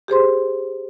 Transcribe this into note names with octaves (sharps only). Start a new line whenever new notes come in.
G4 G#4 C5 C6